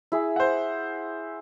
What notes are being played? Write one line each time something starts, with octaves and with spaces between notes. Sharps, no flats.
E4 G#4
C5 F#5